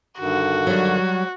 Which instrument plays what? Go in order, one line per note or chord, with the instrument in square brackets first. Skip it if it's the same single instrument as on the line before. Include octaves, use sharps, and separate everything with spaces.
[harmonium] G2 D3 D#3 [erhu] F#4
[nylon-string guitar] F#3 G3